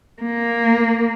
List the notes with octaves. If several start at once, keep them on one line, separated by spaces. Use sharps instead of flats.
A#3